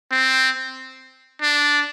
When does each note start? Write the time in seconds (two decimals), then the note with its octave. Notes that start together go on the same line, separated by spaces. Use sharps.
0.12 C4
1.42 D4